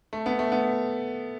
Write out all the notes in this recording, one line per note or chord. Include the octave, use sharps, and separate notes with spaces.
A3
B3
A3
B3